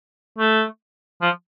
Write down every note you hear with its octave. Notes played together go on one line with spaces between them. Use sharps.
A3
F3